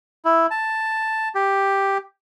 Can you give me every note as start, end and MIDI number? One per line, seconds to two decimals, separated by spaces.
0.25 0.46 64
0.51 1.29 81
1.35 1.98 67